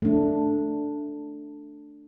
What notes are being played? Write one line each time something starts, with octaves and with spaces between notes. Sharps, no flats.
A3 D4